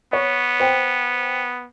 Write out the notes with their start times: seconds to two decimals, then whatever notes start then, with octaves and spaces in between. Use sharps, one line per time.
0.13 B3 C#5
0.60 C5 G5